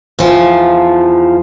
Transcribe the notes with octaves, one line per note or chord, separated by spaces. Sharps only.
E2 F3